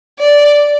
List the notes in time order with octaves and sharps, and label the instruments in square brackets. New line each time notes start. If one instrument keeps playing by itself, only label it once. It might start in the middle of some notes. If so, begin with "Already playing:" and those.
[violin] D5